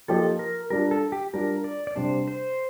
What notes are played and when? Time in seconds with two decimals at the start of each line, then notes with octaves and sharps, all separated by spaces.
0.08 F3 A#3 D#4 G4 A4
0.39 A#4
0.70 G3 D4 F4 A#4
0.91 A4
1.12 G4
1.33 G3 D4 F4 A#4
1.64 D5
1.87 D5
1.96 C3 G3 D4 C5
2.28 C5